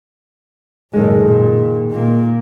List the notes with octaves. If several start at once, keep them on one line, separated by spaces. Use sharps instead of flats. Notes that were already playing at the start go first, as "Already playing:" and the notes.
F#1 A2 D#3 G#3
A#2
A#2 A#3